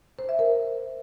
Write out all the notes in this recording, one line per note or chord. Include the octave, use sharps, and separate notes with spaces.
C5
E5
A#4